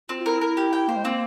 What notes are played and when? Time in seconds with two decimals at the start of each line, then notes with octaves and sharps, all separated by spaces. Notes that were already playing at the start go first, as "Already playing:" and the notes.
0.09 C4 F4
0.20 F4
0.25 E4 A#4
0.41 A#4
0.57 G4
0.73 G5
0.88 A#3 C5
0.97 G#3
1.05 A#3 C4